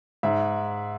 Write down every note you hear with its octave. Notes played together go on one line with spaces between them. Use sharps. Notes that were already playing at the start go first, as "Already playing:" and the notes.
G#2 E5